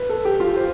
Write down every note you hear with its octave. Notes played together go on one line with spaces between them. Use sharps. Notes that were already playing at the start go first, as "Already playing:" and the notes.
Already playing: B4
A4
G4
F4
C5